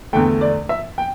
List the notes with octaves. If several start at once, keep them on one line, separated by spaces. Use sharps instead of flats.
E2 D3 A3 G5
D5
E5
G5